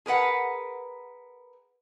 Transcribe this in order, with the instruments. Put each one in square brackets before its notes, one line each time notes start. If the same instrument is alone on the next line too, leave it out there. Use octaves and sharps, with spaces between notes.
[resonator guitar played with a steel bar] G#4 A#4 B4 F#5